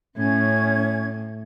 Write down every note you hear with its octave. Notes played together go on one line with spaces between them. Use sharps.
A2 C#4 G#6